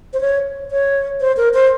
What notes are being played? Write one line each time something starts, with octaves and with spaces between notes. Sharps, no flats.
C5
C#5
C#5
C5
A#4
C5